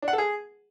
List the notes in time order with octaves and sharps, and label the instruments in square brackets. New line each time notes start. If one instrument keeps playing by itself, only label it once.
[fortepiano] D4
F#5
A4
G#4